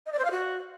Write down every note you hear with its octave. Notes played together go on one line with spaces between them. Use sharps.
D#5
D5
C5
F5
F#4